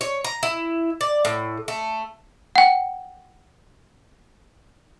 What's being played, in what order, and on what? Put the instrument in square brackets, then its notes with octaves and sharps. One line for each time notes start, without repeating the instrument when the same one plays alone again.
[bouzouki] C#5
A#5
E4
D5
A2
A3
[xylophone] F#5 G5